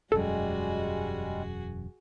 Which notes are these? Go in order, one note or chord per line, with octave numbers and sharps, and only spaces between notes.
E1 F#2 G3 G#3 F#4 G#4 A4